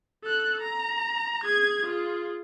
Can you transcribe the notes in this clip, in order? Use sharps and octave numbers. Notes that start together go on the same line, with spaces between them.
A4 F#6
A#5
G#4 G#6
F4 G#4